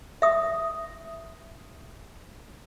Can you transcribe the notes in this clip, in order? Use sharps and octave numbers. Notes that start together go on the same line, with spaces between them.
E5 D#6